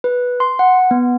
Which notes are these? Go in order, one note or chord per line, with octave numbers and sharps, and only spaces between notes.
B4
C6
F#5
B3